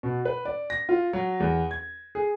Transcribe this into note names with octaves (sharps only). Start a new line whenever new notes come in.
B2
B4
D5
A#6
F4
F#3
E2
G#6
G#4